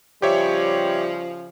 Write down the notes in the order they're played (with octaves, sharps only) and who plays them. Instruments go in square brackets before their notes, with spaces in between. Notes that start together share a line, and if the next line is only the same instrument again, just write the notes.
[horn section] C#3 F3 [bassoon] G3 [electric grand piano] G4 C#5 E5